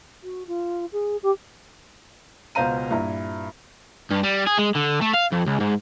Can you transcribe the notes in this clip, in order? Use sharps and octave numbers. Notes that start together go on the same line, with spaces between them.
F#4
F4
G#4
G4
C#2 B2 C5 F5 A#5 D#7
G2 A#2 E4 A#5
G2
G3
G#4
G#3
D3
A3
F5
F2
C#2
G#2